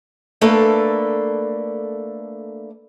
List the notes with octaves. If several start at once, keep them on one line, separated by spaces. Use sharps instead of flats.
A3 A#3 D4 A4 B4